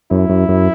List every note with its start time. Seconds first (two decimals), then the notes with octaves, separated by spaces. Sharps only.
0.11 F#2 E4
0.29 F#2
0.49 F#2